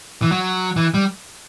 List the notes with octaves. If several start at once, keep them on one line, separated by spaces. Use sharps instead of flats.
E3
F#3
E3
G3